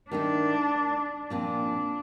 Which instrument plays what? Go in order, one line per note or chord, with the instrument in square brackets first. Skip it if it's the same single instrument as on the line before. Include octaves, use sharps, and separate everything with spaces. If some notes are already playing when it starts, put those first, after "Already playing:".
[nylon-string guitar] D#3 A3 D#4 [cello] D4
[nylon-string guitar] A#2 F3 C4 [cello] D4